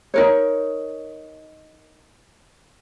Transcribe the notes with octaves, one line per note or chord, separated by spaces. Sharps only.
D#4 A#4 C#5